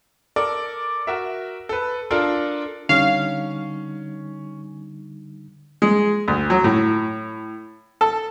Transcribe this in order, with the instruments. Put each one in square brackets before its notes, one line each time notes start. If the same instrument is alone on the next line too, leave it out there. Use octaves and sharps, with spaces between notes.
[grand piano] A4 A#4 D5
F#4 A#4 E5
A4 B4
D4 F4 A4 A#4
[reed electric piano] D3 G3 D#4 [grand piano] C#4 [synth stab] F5
[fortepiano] G#3
D2
F#3
A2
A4